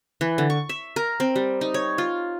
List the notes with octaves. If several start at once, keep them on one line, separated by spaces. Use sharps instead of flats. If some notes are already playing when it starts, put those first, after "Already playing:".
E3
D3
C#6
E5
A#4
C4
G3
D#4
C#5
F4